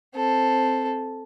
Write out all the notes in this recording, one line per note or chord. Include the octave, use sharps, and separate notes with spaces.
C4 A4